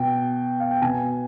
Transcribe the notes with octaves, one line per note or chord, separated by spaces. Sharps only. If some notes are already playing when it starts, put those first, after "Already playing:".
Already playing: B2 G5
F5
G5
B2 G#5